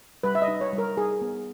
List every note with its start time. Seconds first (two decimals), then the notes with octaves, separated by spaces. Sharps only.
0.23 G3 B4
0.35 E5
0.42 D#5
0.48 D#4
0.61 C#5
0.73 G3
0.78 A#4
0.97 D#4 G#4
1.22 B3